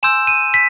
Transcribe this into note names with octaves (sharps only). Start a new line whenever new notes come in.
G#5 C6 E6 G6 E7
D#7
B6